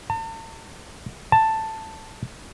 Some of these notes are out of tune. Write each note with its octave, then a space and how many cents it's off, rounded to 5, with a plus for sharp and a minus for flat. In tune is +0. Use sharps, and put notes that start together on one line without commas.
A5 +40
A5 +5